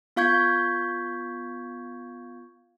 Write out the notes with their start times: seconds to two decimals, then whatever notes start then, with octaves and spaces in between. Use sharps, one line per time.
0.16 B3 F4 F5 C#6 G6 G#6